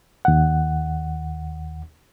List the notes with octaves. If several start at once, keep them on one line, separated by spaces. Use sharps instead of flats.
D#2 F#5